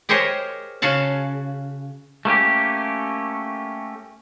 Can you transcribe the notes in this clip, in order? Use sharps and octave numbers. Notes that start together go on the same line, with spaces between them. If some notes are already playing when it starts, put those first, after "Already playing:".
G4 G#4 A#4 C5 C#5 D#5
C#3 F#4 F5 A5
A3 A#3 C#4 G4